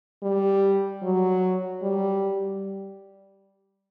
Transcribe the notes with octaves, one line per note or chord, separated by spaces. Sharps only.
G3
F#3
G3